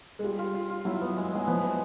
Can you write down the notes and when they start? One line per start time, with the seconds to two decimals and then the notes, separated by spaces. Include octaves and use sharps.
0.19 G#3
0.23 G3 F4
0.39 F4
0.54 F4
0.70 F4
0.85 F#3 E4
1.01 B3
1.16 G#3
1.32 F#3 G#3
1.47 F3 B3
1.63 B3